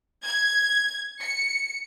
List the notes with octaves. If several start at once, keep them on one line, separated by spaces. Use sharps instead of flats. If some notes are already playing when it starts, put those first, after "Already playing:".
G#6
C#7